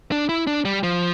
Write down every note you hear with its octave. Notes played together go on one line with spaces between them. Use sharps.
D4
E4
D4
G3
F3